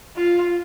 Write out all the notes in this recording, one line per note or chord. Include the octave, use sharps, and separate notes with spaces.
F4